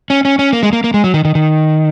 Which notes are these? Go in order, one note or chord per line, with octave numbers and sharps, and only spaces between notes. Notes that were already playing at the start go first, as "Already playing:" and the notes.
C#4
C#4
C#4
A#3
G#3
A#3
A#3
G#3
F#3
D#3
D#3
D#3